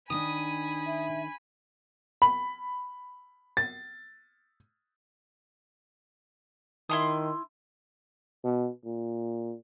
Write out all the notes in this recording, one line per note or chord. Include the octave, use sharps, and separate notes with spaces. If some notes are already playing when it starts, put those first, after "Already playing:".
D#3 D4 G#5 B5 D#6
E5
B5
A6
D#3 E4 C6 D#6
B2
A#2